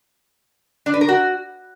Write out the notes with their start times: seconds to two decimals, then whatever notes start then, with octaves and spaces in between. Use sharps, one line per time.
0.86 D4
0.94 B4
1.01 A#4
1.09 F#4